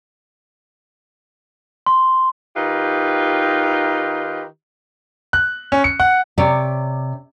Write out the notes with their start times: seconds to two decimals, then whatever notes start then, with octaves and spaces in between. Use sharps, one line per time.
1.86 C6
2.56 D#3 D#4 F4 G4 B4
5.33 F#6
5.72 C#4
5.84 C#7
6.00 F#5
6.38 C3 C#5 D5